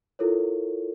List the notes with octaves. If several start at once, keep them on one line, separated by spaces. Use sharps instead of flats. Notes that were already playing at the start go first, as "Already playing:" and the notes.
E4 F4 A4 A#4 C#5